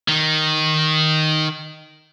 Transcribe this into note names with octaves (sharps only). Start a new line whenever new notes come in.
D#3